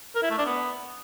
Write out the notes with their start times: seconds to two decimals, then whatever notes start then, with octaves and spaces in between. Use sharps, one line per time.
0.15 A#4
0.23 E4
0.30 A3
0.38 D4
0.46 B3